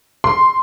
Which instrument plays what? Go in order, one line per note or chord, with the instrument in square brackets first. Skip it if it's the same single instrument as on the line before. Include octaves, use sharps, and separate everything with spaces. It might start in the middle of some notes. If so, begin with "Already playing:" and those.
[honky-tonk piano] C6